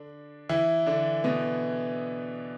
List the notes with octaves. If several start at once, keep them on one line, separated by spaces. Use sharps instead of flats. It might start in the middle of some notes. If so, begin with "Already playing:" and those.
Already playing: D3 D4
E3 E4
D3 D4
B2 B3